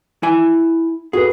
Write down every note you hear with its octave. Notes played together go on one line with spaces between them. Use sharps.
E4 G#5
F#4 G#4 A4 B4